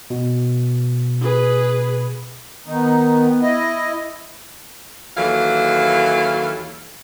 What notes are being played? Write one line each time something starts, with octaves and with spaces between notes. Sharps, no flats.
B2
G#4 B4
D#3 B3 D#4
E4 D#5
D#2 E3 F#3 E4 A4 F5